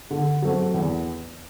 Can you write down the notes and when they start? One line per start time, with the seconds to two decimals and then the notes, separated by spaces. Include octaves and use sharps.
0.11 D3
0.42 F#3 A3 C4
0.74 E2